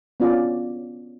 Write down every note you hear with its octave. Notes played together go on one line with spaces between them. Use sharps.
B3 C#4 D4 F4 D5